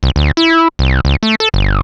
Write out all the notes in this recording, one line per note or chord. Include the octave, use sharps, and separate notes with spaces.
C2
D2
E4
C2
C#2
A3
A4
G1